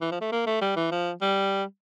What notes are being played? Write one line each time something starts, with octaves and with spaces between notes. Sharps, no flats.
E3
F3
A3
A#3
A3
G3
E3
F3
G3